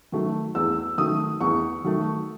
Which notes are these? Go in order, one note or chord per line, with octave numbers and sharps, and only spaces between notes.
D#3 F#3 A3
E2 E6
D#3 F#3 A3 D#6
E2 C#6
D#3 F#3 A3